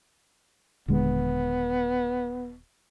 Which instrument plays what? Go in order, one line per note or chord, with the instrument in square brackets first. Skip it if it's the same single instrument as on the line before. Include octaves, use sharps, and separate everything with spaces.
[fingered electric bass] D#1 D3 G#3 [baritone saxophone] B3